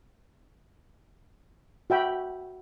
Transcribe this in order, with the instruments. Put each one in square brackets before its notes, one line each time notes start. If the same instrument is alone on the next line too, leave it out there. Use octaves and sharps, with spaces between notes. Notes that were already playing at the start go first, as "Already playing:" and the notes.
[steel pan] F#4 E5 G5 B5